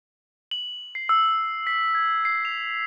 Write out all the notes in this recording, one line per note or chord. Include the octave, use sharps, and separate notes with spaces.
F#7
C7
E6
B6
G#6
C7
F7